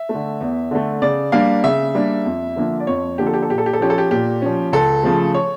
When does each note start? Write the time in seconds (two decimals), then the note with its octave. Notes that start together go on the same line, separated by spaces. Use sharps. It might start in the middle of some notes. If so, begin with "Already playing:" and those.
Already playing: E5
0.09 A3
0.14 D3
0.41 E2
0.71 D3 A3
1.02 C#3 D5
1.32 G3 A#3 D4 F5
1.64 C#3 E5
1.95 G3 A#3 D4
2.26 F2
2.56 D3 F3 A#3 D4
2.80 D5
2.87 F2 C#5
3.18 D3 F3 A#3 D4 G4
3.26 A4
3.34 G4
3.42 A4
3.49 A#2 G4
3.58 A4
3.66 G4
3.73 A4
3.80 F3 C#4 G4
3.90 A4
3.98 G4
4.11 A#2 G4
4.42 F3 C#4
4.72 C#2 A4
5.04 C#3 F3 A3
5.34 C#5